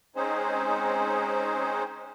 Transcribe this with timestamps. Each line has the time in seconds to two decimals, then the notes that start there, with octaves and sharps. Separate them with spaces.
0.16 G#3 C4 C#4 D#4 G#4 C5